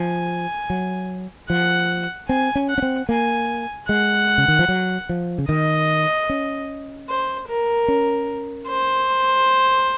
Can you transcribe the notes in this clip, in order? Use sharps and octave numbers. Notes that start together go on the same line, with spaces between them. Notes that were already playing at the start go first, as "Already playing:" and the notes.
Already playing: F3 G#5
F#3
F3 F#5
C4 G#5
C#4
F#5
C#4
C4
A#3 G#5
G#3 F#5
C#3
D#3
F3
F#3
F3
C#3
D#3 D#5
C#4
C5
A#4
C#4
C5